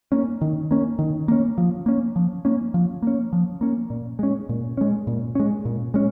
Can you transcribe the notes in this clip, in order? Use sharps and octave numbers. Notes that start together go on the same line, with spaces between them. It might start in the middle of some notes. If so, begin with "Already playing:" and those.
A#3 C#4
D#3
A#3 C#4
D#3
A#3 C#4
F3
A#3 C#4
F3
A#3 C#4
F3
A#3 C#4
F3
A#3 C#4
A#2
G#3 C#4
A#2
G#3 C#4
A#2
G#3 C#4
A#2
G#3 C#4